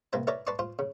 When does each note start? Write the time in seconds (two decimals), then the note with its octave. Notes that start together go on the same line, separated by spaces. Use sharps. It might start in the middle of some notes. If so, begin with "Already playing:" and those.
0.13 C2 A#3 B4 C5 A#5
0.27 E4 A#4 B4 C#5 D5 A#5
0.47 B4 D5 A5 C6 C#6
0.59 F4 C5
0.79 C#3